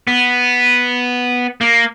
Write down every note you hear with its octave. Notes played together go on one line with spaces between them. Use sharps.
B3
A#3